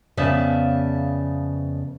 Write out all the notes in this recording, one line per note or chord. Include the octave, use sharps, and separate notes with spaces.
F2 C#3 B3 D5 E5 A5